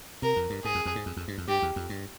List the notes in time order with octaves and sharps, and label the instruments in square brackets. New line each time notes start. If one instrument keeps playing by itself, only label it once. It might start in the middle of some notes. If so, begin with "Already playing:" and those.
[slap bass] C3 [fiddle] A#4
[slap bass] F2
G2
[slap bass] G#2 [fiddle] G#4
[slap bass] F2
F2
G#2
F2
F2
G2
F2
[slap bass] G2 [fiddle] G4
[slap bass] E2
F2
G2